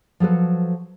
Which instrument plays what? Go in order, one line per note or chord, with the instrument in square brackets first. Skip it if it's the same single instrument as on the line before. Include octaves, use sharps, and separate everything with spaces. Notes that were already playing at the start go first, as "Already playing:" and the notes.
[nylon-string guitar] F3 F#3 A4 B4